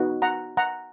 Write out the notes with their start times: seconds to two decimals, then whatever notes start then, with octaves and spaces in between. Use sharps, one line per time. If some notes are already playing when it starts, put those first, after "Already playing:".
Already playing: B3 D#4 F#4
0.22 F#5 A#5
0.57 F#5 A#5